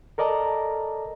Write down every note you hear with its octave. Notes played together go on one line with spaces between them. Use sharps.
A4 A#4 D5 D#5 A5 A#5